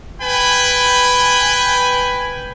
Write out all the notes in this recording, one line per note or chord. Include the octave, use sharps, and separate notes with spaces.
B4 G5 G#5 B5